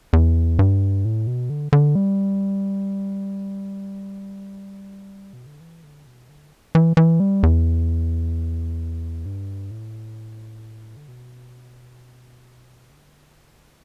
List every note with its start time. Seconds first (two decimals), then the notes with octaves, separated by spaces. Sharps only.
0.13 E2
0.59 G2
1.05 A2
1.27 B2
1.50 D3
1.73 D3
1.95 G3
5.33 B2
5.46 D3
5.60 E3
5.84 D3
6.06 B2
6.29 D3
6.75 E3
6.97 E3
7.20 G3
7.43 E2
9.26 G2
9.71 A2
10.97 D3
11.08 B2
12.91 D3